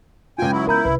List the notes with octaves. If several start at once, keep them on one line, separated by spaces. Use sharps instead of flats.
C#2 F4 G5 G#5
F#3 E4
B3 E4 A#4 A#5 G6
C2 B4